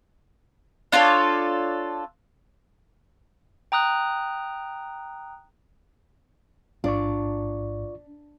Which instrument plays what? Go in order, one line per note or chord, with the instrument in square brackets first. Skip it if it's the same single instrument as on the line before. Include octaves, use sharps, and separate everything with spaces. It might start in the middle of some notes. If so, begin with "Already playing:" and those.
[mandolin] D4 F4 A4 C#5
[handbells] G5 A#5 D#6 F#6
[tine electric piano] A1 G#2 [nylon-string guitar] D4 [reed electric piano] F4 D5 C#6